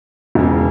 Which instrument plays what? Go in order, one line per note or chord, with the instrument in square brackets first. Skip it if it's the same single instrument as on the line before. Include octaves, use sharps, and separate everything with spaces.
[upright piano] E1 E2 C#3